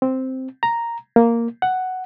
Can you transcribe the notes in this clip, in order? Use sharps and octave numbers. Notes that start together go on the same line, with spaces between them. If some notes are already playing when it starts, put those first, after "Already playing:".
C4
A#5
A#3
F#5